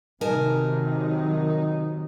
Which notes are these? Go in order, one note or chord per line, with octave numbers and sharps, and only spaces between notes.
C3 D#3 F#3 D#4 A#4 G#5 A5